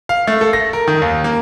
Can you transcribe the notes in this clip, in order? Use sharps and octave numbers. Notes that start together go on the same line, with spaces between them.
F5
A3
A4
A#6
A#4
D#3
D#2
A#3